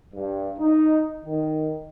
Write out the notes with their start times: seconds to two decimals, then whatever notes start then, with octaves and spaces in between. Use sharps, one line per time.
0.13 G2
0.58 D#4
1.24 D#3